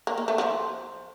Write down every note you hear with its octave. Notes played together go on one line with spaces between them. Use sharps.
A#3
A#3
A3
F3